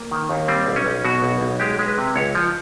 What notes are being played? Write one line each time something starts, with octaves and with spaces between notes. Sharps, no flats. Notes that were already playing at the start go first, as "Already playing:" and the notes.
Already playing: A#3
D#3
D#2
G3 C4
B1
C#4
B1
B2 F#4
B1
B1
G#3 G4
G#3
B4
C3
C#2 C#5
F3